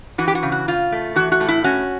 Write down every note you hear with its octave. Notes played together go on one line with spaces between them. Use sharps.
E3 F#4
G4
F#4
C#3
F#4
C#3 F4
A3
E3 F#4
F#4
A2
E4
C#4 F#4